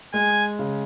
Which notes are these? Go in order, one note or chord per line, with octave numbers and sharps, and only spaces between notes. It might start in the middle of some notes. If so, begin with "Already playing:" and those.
G#3 G#5
C#3